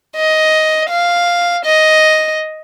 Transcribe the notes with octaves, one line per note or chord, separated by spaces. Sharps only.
D#5
F5
D#5